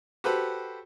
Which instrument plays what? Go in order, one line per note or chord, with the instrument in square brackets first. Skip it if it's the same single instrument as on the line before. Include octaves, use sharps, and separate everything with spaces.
[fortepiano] F#4 G4 A4 B4 C5